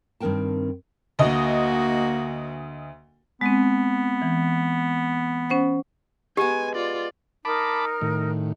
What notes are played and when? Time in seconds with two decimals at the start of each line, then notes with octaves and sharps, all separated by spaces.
0.20 G2 D#3 C4 A#4 G5 A5
1.19 D2 A#3 F#4 D#5
3.41 G#3 B3 C4
4.22 E3
5.50 C#4 C5 F#5
6.37 G#3 B3 G4 G#5
6.75 F4 D5
7.45 D#4 A#4 A5 B5 D6
8.01 A2 D#3